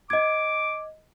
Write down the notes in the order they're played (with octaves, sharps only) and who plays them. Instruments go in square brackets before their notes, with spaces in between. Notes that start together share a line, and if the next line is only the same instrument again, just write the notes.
[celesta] D#5 G#6 [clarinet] D6